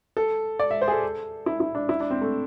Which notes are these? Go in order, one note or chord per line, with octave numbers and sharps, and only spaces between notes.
A4
D5
E5
C5
G#4
A4
E4
E4
D4
E4
D4
C4
A3